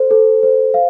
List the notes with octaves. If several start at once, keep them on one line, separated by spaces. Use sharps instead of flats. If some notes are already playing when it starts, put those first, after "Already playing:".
Already playing: A4 C5
A4
C5
F5